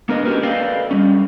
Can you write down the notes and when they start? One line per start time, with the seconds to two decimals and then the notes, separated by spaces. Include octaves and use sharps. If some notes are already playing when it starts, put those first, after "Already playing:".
0.09 A#3 D4 A#4 B4 D#5
0.25 C#4 F#4 G4 A#4 B4
0.43 A4 B4 D5 D#5 F5 G5
0.91 G3 C#4